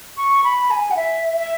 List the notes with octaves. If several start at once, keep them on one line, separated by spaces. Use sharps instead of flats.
C#6
B5
G#5
F#5
E5
E5